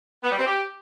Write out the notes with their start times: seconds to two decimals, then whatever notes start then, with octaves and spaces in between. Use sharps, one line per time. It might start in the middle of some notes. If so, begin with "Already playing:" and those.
0.24 B3
0.31 G3
0.39 C4
0.47 G4